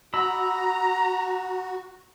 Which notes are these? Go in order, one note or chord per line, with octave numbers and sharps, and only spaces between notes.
F#4 D#5 A#5 B5 E6